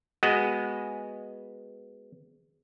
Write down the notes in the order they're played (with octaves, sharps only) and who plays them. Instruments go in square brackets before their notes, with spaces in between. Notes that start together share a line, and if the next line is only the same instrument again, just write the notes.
[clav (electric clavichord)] G#3 B3 F#4 D#5